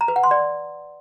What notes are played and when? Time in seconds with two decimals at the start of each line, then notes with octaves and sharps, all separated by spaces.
0.01 A#5
0.08 B4
0.16 F#5
0.23 C6
0.31 D5